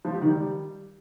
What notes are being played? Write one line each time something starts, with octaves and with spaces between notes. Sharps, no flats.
F3
G4
D#3
G3